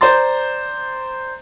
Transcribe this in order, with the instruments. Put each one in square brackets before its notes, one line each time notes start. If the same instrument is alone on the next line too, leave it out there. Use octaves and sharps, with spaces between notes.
[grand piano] C5 D5 A#5 C6 A6